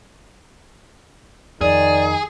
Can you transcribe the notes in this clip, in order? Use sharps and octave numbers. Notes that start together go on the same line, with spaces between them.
F2 D#3 G#4 D5